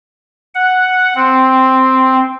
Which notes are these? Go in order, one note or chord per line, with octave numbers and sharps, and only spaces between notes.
F#5
C4